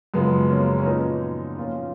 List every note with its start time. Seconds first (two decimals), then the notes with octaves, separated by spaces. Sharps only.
0.14 F#2 C#3 F3 G#3 B3
0.50 A#3 C#4
0.78 C#4
0.86 A#2 F3 B3 D#4
1.58 A#2 F3 C#4 F4